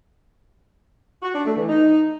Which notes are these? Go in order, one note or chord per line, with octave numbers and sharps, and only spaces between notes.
F#4
D4
A3
E3
D#4